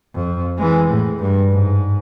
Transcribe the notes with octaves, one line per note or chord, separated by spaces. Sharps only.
F2
E3 G#3
A2
G2
G#2